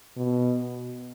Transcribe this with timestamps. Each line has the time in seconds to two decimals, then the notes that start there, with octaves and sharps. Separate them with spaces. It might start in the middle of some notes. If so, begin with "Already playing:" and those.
0.17 B2